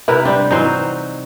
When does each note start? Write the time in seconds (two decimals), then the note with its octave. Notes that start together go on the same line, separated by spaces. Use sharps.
0.08 C3 E4 A#4 B4
0.25 G3 C4 D4
0.51 E3 F#3 C4 D#4 C5